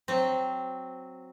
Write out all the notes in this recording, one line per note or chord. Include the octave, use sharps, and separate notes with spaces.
F#3 C4